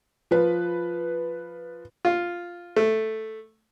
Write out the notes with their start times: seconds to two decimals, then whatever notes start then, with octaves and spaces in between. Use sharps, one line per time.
0.31 F3 B4
2.05 F4
2.76 A3